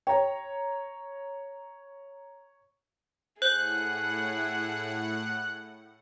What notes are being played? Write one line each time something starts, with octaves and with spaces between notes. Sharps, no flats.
C#5 G5 A#5
A2 E4 G#4 A4 C5 F#5 F#6